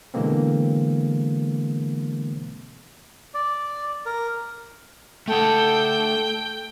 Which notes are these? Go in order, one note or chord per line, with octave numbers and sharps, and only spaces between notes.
B2 D3 E3 G#3 A#3 C4
D5
A#4
A3 A4 F#5 G5